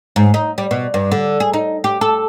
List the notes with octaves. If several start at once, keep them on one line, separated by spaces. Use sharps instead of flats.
G#2
D#4
G3
B2
G2
D3
G#4
D#4
G4
A4